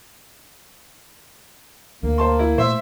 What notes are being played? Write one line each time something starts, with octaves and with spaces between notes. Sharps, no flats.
D2 A#3
C5 A5 C6
E4
A#2 A3 C5 E5